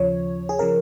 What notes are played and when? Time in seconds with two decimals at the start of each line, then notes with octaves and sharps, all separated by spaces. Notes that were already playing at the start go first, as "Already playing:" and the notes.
Already playing: D#2 C#3 F3 C#5
0.49 G#4
0.59 C#3 F3 A#4